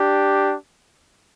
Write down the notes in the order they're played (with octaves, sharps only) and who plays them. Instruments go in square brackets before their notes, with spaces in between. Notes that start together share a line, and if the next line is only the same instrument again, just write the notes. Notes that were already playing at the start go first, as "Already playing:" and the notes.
Already playing: [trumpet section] D4 G4